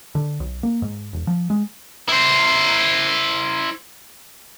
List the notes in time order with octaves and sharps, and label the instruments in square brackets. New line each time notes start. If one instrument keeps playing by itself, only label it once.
[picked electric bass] D3
B1
A#3
G#2
E1
F3
G#3
[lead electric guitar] E4 C5